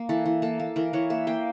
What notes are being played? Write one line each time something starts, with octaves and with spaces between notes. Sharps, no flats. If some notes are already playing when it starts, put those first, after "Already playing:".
Already playing: A#3
E3 A4
E3
A#3 A4
A#3
E3 A#4
E3 C#5
A#3 E5
A#3 G5